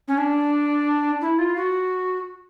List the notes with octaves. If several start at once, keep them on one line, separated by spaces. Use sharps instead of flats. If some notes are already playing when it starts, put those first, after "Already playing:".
C#4
D4
E4
F4
F#4